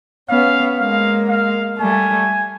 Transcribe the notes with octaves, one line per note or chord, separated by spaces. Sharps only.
B3 C#4 F5
G#3 A#3 F5
F5
G3 A3 G#5